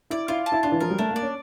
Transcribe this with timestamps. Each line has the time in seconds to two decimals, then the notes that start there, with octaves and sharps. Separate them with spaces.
0.10 E4 D5
0.28 E4 F4
0.46 A5
0.52 E4
0.63 D4 F4
0.72 E3
0.80 F3 A#4
0.90 G3
0.98 A3 D4
1.11 A#3
1.16 D5
1.22 C#4